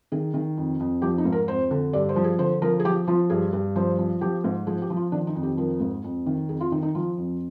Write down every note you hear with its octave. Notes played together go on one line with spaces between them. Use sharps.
D#3 G#4
D#3
F2
F2
F3 G4
D#4
G#2
A#4
F2 C5
D3
G2 D5
C5
F3
G#4
D3 C5
F3 A#4
G#4
F3 G4
F3 F4
G2 G#4
G2
F3 C5
F3
F3 G4
G#2
F3 G#4
G4
F3
F4
D#3 D4
D#4
F2
G4
F3 A#4
G#2
F2
D#3
F2 G#4
F4
D#3 D#4
D#4
F3 F4
F2